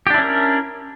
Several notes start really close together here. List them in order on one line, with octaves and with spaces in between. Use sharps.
G4 D4 E4 C#4 A#4